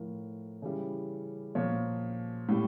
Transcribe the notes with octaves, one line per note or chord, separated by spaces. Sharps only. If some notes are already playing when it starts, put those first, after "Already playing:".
Already playing: A2 F3 A#4
C#3 E3 G3
A#2 F3 C#5
A2 G3